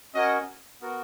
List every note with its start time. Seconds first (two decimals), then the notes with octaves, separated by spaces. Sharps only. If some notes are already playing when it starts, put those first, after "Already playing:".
0.14 C#4 F#4 A#4 C#5 D#5
0.81 B3 F#4 A#4